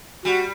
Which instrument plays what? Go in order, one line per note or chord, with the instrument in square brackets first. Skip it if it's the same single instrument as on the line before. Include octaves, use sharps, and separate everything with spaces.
[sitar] G3 [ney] F#4